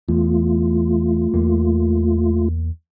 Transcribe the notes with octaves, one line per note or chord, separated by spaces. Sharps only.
E2 A3 F4
E2 A#3